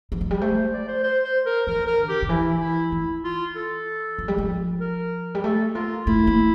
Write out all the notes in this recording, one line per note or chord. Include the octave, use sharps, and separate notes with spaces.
E3
F3
G3
A3 C5
C5
D5
C5
C5
C5
A#4
E3 A#4
A#4
D3
G4
D3
E3 E4
E4
E3 E4
F4
A4
F3
G3
F3
A#4
G3
A3 A4
A#3 F4
A3 E4
A#3